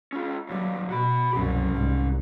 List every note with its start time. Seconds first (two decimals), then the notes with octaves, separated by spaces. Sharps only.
0.13 C#4 F4
0.49 D#2 F#3 G3
0.90 B2 F#4 B5
1.33 C2 F#2 C#4 G4
1.71 C2 G#2